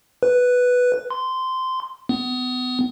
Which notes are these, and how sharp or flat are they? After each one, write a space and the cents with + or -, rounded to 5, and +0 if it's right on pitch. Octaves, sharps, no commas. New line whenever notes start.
B4 +0
C6 -15
B3 +30